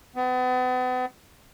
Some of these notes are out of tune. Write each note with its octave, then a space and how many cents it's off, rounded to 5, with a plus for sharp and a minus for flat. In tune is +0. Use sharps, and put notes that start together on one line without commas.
B3 +40